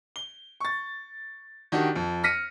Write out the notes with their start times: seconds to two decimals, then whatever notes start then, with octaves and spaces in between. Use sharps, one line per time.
0.16 G7
0.60 C#6 A6
1.72 D#3 D4 F#4 G4
1.95 F2
2.24 F6 A#6 B6 C#7 D#7